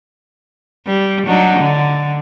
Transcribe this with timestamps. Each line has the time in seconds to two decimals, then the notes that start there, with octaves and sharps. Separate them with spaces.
0.87 G3
1.27 F#3 D4 D#4
1.59 D3